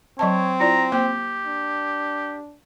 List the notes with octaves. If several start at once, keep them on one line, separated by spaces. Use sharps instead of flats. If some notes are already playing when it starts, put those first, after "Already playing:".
F#3 C4 C#5 D#5 A5
E4 F4 D5 A#5
A#3 G4 C5 G5
D4